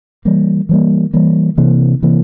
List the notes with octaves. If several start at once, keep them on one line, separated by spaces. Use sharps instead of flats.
E3 G3 A#3
E3 G3 A#3
E3 G3 A#3
C3 E3 A#3
C3 E3 A#3